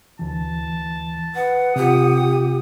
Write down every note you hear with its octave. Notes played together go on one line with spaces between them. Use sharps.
D2 E3 A5
B4 F#5
C3 F4 G4 D#6